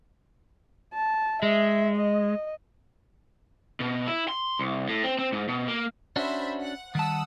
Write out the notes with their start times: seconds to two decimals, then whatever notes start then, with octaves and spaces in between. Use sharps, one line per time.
0.95 A5
1.43 G#3 E5
1.96 D#5
3.80 B2
4.07 E4
4.29 C6
4.59 C2
4.89 A2
5.03 C4
5.19 C4
5.33 G#2
5.48 B2
5.68 A#3
6.16 C#4 D4 F#4 C5 E5 B5
6.61 F#5
6.95 D#3 G3 F#5 A5 D#6 E6